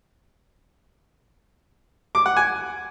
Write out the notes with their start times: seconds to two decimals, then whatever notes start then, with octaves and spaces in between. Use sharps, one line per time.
2.15 D6
2.26 F#5
2.37 G#5